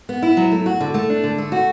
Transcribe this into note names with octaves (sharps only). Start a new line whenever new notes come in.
B3
E4
F#3
A3
F#4
D3
A3
D4
D3
A3
F#4